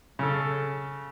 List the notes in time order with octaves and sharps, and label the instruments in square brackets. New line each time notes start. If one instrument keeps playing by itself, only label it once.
[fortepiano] C#3 A4